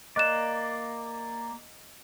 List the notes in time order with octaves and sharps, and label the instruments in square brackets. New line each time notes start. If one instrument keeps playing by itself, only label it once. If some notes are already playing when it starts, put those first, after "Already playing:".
[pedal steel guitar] A#3 D5 [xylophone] D#5 F#6 E7